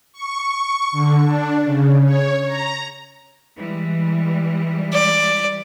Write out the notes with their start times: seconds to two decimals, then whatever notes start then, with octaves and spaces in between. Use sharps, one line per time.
0.12 C#6
0.92 D3
1.25 D4
1.65 C#3
2.04 C#5
2.46 A#5
3.56 E3 G3 G#3
4.93 D5